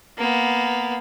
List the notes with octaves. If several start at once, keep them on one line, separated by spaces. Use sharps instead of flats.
A#3 B3